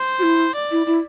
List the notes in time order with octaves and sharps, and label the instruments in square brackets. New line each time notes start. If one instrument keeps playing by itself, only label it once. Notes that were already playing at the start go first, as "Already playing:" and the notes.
Already playing: [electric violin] C5
[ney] F#4
E4
[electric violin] D5
[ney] E4
E4